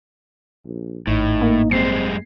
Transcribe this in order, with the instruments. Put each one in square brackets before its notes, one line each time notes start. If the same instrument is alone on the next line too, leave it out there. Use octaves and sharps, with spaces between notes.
[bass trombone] A#1
[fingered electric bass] G#1 [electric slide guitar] A2 [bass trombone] D#4
[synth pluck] A#3
[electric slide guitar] F#2 G3 G#3 [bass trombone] C4 [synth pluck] C7